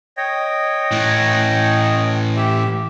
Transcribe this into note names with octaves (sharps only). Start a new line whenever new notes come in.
C#5 D#5 G5
A2 E3
G4 E5